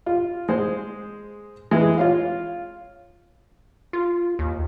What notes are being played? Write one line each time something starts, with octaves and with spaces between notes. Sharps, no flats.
F4
G#3 C5
E3 G#3
F4 C#5 F5
F4
D#2